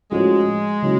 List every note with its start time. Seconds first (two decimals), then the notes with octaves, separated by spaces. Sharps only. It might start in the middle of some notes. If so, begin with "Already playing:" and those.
0.12 A2 F3 G#3 A3 C#4 F#4
0.82 C#3 F#3 A#3 C#4 E4